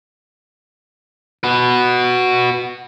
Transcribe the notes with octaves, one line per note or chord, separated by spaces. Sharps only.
F#4 B4